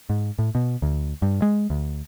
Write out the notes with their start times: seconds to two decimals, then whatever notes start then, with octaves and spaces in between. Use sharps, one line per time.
0.10 G#2
0.39 A2
0.55 B2
0.82 D2
1.22 G2
1.42 G#3
1.70 D2